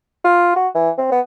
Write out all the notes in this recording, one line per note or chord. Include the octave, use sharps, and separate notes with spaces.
F4
F#4
E3
C4
B3